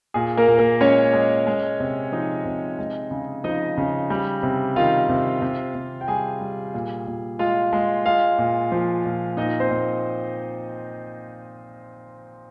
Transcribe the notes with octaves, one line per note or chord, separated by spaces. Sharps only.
A#2 G#4
A#3 A#4
A#2
A#3 A#4
G#3 C#4 C#5
G#3
G#3
C3
F3 D#4 D#5
C3
G#3
C#3
F3 D#4 D#5
C#3
G3
C3
D#3 F4 F5
C3
C3
C3
G5
G3 G#4 G#5
G3
A#2
A#2
G#3 F4 F5
G#3
G#3 F4 F5
A#2
F3
A#2
A#2 D#4 D#5
C4 C5
A#2